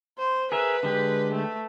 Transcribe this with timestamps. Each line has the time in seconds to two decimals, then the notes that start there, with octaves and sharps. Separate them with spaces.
0.19 C5
0.52 G#4 A#4 B4 E5
0.83 D3 G#3 G4
1.33 A3